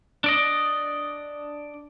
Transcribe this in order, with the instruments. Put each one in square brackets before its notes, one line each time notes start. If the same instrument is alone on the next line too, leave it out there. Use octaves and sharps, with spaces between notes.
[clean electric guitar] D4 D5 D#5